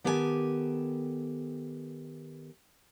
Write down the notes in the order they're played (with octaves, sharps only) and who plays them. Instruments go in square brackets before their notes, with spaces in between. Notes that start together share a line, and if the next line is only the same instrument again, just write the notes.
[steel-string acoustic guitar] D#3 B3 G4 A4 C#5 G#5